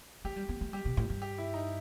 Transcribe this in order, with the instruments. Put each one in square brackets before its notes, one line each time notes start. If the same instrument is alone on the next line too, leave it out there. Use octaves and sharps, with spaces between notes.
[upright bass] A3 [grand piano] G4
[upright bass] G3
B3
A3
[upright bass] G3 [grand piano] G4
[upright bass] B2
A2
G2
[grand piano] G4
E4
D#4